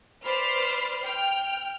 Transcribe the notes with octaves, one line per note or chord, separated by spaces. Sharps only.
B4 C5 D5 B5 C6 F6
G5 F6